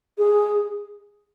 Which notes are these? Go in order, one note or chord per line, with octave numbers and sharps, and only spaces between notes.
G#4